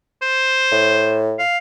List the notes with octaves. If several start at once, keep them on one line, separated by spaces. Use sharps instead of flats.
C5
A2
F5